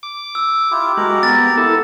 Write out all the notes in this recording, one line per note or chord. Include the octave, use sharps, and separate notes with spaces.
D6
E6
E4 F4 G4
G#3 F#4 G4 A#4 A#5
B3 A6
E4 A4